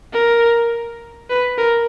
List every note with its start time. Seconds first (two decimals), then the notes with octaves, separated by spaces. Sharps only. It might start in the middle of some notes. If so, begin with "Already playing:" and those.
0.13 A#4
1.30 B4
1.58 A#4